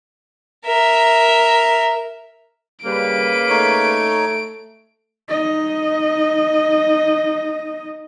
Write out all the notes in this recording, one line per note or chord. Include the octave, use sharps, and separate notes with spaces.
A#4 E5
C#3 G3 A#3 B4 D7
A3 D#4 C#5
D#4 D#5